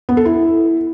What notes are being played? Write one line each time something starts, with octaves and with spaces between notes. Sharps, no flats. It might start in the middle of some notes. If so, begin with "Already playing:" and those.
B3
A4
E4